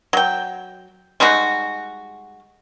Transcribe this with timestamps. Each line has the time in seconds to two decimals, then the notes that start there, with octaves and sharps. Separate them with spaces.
0.13 F#3 G5
1.20 G3 G#3 D#4 F#4